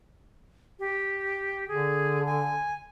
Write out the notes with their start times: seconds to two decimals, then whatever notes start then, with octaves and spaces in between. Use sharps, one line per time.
0.79 G4
1.68 D3 G#4
2.26 G#5